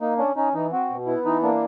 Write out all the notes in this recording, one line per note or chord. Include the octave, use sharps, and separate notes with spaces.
A#3 D#4
C#4 D4
C#4 D#4
E3 D#4
C4 F#4
B2
B3 E4
E3 D#4
A#3 D4